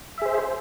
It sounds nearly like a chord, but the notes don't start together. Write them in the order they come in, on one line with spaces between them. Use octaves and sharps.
E5 G#4 C5